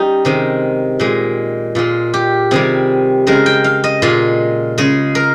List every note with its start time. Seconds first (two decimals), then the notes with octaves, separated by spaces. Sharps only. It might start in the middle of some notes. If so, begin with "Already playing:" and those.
Already playing: G3 C#4 D#4
0.25 C3 D#3 G#3
1.00 A#2 G#3
1.75 A#2 G#3 F4
2.14 G4
2.51 C3 D#3 G3 G#4
3.27 C#3 G#3 A#4
3.46 G5
3.64 F5
3.84 D#5
4.02 A#2 G#3 F4
4.78 C#3 G#3 G#4
5.15 A#4